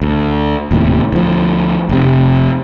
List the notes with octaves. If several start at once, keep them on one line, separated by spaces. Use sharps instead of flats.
D2
D#1 D#2 A2 C3
D2 F3
F1 C3